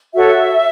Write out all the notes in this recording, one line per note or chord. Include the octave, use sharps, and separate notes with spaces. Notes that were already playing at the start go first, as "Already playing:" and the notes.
F#4 A4 C#5 E5